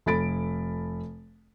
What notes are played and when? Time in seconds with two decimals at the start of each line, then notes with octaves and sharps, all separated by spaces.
0.06 F1 A4 B5 A6 D7